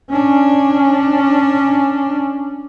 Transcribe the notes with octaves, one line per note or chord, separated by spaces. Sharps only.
C#4 D4